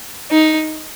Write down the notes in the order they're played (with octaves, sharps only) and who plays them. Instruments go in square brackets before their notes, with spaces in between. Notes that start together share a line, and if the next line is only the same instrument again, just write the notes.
[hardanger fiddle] D#4